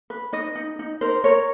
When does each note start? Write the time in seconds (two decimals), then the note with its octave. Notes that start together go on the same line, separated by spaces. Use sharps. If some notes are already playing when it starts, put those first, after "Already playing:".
0.10 B4
0.33 D#4 D#5
0.55 D#4
0.79 D#4
1.01 A#4 C5
1.24 A#4 C#5